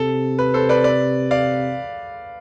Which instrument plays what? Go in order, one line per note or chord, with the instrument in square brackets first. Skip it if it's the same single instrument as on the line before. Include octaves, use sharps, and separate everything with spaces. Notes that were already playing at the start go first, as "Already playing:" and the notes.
Already playing: [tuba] C3 [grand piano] A4
[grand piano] B4
A4 C5
B4 D5
B4 D5
D5 F5